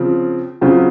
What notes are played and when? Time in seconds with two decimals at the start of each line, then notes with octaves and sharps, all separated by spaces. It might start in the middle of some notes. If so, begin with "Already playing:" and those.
Already playing: C#3 F3 C4 F4
0.61 C#3 F#3 C4 F4 C5